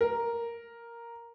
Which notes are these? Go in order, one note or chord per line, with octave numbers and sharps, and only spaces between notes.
A#4